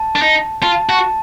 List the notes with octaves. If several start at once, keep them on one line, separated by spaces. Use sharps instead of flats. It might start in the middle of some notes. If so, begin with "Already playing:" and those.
Already playing: A5
D4
D#4
F4 A5
F#4 A5